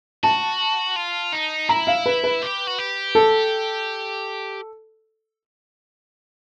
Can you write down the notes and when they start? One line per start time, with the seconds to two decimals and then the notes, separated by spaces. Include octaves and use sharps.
0.23 F#4 A5
0.96 F4
1.33 D#4
1.69 E4 A#5
1.87 F5
2.06 B4
2.24 B4
2.42 G4
2.67 F#4
2.79 G4
3.15 A4